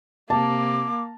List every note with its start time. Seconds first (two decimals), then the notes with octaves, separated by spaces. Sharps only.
0.30 C3 A#3 A5 D6